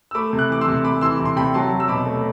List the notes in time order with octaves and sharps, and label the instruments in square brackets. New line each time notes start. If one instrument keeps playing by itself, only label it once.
[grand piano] E6
A3 B5 D6
C3
D6 F#6
E3 D6
C6 E6
C3
C3 B5 D6
E3 C6 E6
C3
C6
C3 G5 B5
F#3 A5 C6
F#3
E6
B2 B5 D6
A3